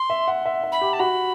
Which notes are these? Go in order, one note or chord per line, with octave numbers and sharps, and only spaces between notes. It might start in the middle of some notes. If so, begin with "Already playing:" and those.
Already playing: C6
E5
F#5
E5
E5
B5
G4
A5
F#4 B5